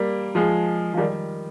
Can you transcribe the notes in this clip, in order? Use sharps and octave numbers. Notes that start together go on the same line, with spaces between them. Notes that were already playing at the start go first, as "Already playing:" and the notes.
Already playing: G3 A#3
F3 G#3
F3
D#3 G3